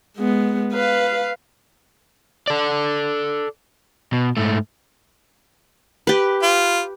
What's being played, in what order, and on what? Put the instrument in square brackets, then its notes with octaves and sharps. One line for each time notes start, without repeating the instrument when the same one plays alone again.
[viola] G#3 B3
B4 F5
[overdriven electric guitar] A4 D5
B2
G#2 A3
[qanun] G4 B4
[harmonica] F4